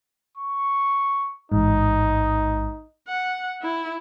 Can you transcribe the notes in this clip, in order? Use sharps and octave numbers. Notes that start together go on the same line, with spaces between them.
C#6
A1 G#2 D#4
F#5
E4